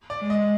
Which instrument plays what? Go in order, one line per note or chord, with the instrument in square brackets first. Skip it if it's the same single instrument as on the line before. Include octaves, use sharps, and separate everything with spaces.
[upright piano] D5
[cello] G#3
[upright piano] D#5